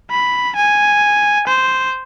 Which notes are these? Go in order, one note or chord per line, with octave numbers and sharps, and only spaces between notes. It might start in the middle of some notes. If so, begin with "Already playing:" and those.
B5
G#5
C5